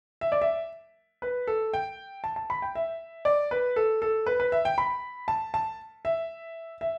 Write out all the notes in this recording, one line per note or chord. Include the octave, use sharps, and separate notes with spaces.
E5
D5
E5
B4
A4
G5
A5
A5
B5
G5
E5
D5
B4
A4
A4
B4
B4
E5
G5
B5
A5
A5
E5
E5